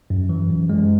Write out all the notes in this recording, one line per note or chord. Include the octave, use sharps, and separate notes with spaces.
F#2
E3
F#2
G#3